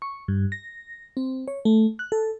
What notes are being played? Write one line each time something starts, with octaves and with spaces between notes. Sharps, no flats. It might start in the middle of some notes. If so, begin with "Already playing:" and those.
C#6
G2
A#6
C4
C#5
A3
F#6
A4